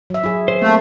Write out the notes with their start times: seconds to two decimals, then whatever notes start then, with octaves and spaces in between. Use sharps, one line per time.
0.10 F#3 E5
0.24 E4 G#4
0.48 C5
0.61 A3 A#3 C4